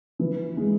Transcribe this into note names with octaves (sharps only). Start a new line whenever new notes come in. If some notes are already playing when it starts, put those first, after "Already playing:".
E3
G#3